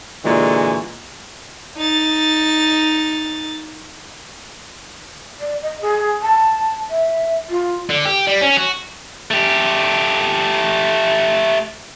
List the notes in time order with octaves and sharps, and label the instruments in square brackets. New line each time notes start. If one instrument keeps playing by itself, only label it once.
[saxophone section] A#2 D3 E3 G#3 F#4
[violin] D#4 A6
[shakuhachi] D5
D#5
G#4
A5
E5
F4
[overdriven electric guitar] D3
G4
G3
C#4
F#4
[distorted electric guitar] A3 G4